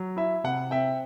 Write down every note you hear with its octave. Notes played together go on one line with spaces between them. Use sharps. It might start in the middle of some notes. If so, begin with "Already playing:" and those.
Already playing: F#3
E4 E5
C3 F#5
C4 E5 G5